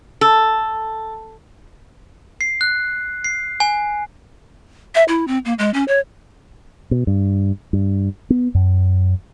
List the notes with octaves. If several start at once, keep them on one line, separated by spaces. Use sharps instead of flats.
A4
C7
F#6
C7
G#5
E5
E4
C4
A#3
G#3
C#4
C#5
B2
G2
G2
B3
F#2